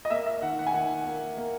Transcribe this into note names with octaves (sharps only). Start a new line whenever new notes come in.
D#5
A#3 E5
E5
D#3 F#5
F#5
G#5
D#3 F#5
A#3
A#3